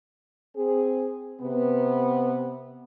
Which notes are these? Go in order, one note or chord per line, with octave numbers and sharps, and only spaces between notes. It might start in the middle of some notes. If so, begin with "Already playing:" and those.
C4 G#4
C3 B3